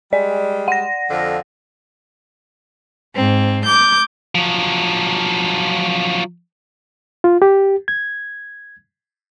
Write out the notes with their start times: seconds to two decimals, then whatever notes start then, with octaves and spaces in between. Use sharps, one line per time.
0.13 G3 G#3 D5
0.68 F#5 A#6
1.10 F2 D3 F3
3.15 G#2 C4
3.65 D6 G6
4.35 F3 F#3
7.24 F4
7.42 G4
7.88 G#6